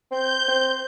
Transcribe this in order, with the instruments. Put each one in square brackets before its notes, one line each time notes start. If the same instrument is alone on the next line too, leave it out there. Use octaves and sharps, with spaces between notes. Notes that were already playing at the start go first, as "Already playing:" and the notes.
[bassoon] C4 [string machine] G6
[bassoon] C4